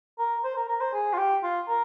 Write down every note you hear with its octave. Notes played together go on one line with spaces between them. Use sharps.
A#4
C5
A#4
A#4
C5
G#4
F4
G4
F4
A#4